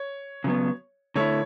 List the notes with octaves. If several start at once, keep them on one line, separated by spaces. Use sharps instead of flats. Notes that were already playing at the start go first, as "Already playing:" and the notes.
Already playing: C#5
C#3 F#3 B3
D3 A3 E4 C#5